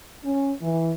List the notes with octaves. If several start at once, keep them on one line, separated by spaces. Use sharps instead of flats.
C#4
E3